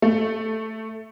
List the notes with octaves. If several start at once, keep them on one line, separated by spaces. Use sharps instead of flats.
A3